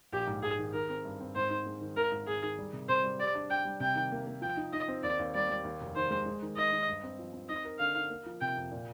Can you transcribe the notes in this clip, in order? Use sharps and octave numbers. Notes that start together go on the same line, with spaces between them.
A#1 G4
G#2
G#2 G#4
D#3
D#3 A#4
C4
G2
C4
G#2 C5
D#4
G#3
D#3
G#1 A#4
G#2
G#2 G#4
D#3
G3
C3
C3 C5
G3
G4 D5
D4
D4 G5
G3
C3 G5
D#3
A#3
A#3
F3 G5
D#4
D#4 D#5
C4
D#2 D5
D#2
G3 D5
G3
D#2
F1
D#3 C5
G#3
G#3
D#3
D#3 D#5
D#3
G2
C4
F3
C4
D#4 D#5
A#4
D3 F5
D#4
A#3
F3
C3 G5
F2
A#2